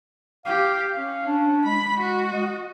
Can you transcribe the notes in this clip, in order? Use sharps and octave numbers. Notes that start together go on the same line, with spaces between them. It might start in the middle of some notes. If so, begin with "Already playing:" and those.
G4 F5
C#4 F5
D4
G#3 B5
F#4
D#5